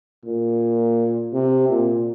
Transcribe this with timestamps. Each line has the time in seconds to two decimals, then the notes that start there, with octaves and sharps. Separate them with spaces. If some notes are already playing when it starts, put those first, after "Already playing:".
0.25 A#2
1.33 C3
1.69 A#2